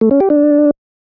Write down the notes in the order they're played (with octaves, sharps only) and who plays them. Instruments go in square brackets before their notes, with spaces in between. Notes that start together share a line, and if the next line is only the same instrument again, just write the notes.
[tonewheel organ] A3
C#4
G4
D4